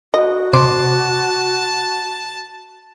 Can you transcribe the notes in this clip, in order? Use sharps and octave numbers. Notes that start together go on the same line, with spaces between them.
F#4 D#5
C3 A5 C6 D6